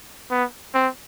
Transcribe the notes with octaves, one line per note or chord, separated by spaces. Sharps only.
B3
C4